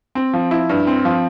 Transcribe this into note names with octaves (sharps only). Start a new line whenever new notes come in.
C4
F3
E4
G2
C4
F3